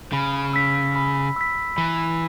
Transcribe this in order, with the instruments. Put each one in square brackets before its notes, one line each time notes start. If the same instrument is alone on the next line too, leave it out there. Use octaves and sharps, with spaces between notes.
[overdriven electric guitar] C#3 [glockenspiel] B5
[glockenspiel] E6 B6
B5
E6 B6
[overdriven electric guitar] E3 [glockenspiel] B5